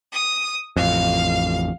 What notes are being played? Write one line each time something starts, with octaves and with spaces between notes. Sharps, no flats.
D#6
A1 F2 F5